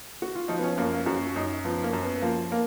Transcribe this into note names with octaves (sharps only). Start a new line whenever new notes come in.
F#4
F4
F3 D#4
B3
C#4
F#2 A#3
A#3
F#2 F#4
F#2 D#4
F3 B3
A#3
F#2
B3
F3 A#3
A#3